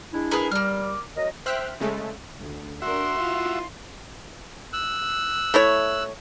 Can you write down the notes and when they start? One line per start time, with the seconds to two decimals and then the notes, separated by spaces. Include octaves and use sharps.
0.13 G#3 D4 E4
0.31 G#4 A#4 B4
0.52 G3 A#3 F6
1.17 F#3 A#4 D#5
1.46 C5 E5 G5 F6 F#6 B6
1.80 C#3 G#3 A3
2.39 D2
2.82 D4 F#4 A#4 E5 C6
3.15 E4 F4
4.73 E6 F#6
5.54 A3 E4 C#5